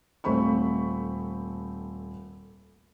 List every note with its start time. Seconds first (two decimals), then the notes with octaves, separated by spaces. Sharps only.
0.24 D#1 A3 C4 B5 C#6